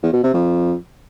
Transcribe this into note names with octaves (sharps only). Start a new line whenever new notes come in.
E2
B2
C3
F2